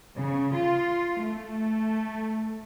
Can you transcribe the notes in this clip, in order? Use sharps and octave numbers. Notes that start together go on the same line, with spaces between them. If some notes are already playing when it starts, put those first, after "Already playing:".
C#3
F4
A3